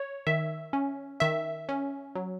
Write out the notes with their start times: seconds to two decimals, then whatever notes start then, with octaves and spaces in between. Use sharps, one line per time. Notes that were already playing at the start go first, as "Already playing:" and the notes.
Already playing: C#5
0.27 D#3 E5
0.73 C#4
1.20 D#3 E5
1.69 C#4
2.15 F#3